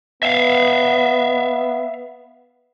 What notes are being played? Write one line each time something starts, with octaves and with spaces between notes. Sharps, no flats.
B3 E5 F5